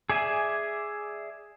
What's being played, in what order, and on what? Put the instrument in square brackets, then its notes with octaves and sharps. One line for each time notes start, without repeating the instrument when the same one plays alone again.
[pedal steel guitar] G#4 D5 E5 G#5